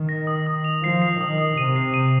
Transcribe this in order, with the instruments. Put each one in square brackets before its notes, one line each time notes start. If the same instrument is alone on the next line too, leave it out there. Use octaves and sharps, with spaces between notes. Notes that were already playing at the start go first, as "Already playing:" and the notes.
Already playing: [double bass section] D#3
[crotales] A#6
D#6
D#6
F7
[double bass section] F3 [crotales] C7
[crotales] C7
[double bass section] D#3 [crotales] D#6
[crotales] D#6
[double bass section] C3 [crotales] D#7
[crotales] C7
D#7